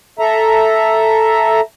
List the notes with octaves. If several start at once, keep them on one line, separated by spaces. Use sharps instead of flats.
A4 E5 A#5